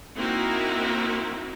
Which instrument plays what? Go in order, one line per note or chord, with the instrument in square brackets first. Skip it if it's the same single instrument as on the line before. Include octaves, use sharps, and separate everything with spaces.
[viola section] A#3 C4 D#4 E4 F#4 A#4